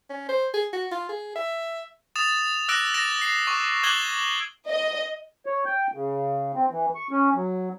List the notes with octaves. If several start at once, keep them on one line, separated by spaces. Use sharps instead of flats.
C#4
C5
G#4
F#4
F4
G#4
E5
D#6 A6 E7 F7
D6 E6 F#6 A#6 D7 E7
A6 A#6 D7 E7
C7
C#6 D6
D6 F#6 G#6 E7 F#7 G7
D#5
C#5
G5
C#3
C4
E3
C#6
C#4
F#3